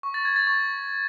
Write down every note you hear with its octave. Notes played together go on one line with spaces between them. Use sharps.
C#6
A6
G#6
A6
C#6